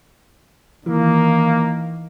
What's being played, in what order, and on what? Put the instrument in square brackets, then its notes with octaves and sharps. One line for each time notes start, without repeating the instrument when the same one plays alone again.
[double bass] D#3 [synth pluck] E3 [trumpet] A#3